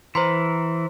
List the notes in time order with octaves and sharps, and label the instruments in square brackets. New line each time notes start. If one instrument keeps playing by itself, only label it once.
[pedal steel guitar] E3 [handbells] C5 A#5 C6